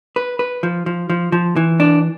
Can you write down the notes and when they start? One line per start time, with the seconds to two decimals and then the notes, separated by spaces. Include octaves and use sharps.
0.16 B4
0.39 B4
0.63 F3
0.86 F3
1.10 F3
1.32 F3
1.56 E3
1.80 D4